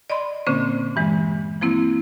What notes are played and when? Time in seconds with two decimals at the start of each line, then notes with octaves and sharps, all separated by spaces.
0.10 D5 D#5 B5 C6
0.47 A#2 D3 A#3 C4 C#4 C5
0.96 G2 E3 G#3
1.61 F3 A#3 C4 E4